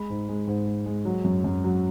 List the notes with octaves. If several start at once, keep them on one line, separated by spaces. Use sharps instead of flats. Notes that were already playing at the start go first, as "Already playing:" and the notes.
Already playing: G#3 B5
G#2
G#3
G#2
G#3
G#3
F#3
F#2
F#2
F#3